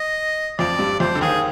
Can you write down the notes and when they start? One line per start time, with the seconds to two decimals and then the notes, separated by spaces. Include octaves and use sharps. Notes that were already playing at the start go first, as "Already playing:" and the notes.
Already playing: D#5
0.59 F2 F3 D5
0.79 G2 G3
1.00 F2 F3 C5
1.15 D3
1.21 D#2 D#3 G#4